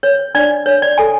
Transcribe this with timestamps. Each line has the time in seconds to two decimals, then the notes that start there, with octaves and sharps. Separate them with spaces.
0.03 C#5
0.35 D4 D5
0.66 D4 C#5
0.82 D5
0.98 A4 G#5